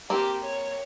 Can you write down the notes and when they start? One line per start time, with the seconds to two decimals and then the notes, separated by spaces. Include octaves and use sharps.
0.10 A#3 C4 G4
0.44 C#5